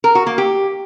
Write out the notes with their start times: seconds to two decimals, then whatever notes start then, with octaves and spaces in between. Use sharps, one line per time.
0.04 A#4
0.15 F#4
0.27 A#3
0.38 G4